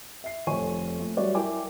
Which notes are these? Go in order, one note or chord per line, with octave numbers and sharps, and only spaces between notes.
E5 C7
F1 F2 C#5 G#5 C#6 D#7
A3
F#3 G3 F#4 C#5 D5 E5
E4 A#4 G5 G#5 D6